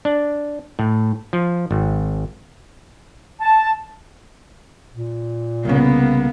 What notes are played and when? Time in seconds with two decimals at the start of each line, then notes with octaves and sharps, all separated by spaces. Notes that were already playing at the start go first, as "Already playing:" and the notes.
0.05 D4
0.79 A2
1.33 F3
1.71 G#1
3.39 A5
4.94 A#2
5.65 C2 C#3 A#3 B3